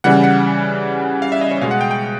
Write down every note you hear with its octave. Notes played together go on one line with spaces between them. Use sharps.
C#3 E3 G3 F#5
F#5
F5
E5
D#5
C#5
B2 G#3 F5
F#5
G5
G5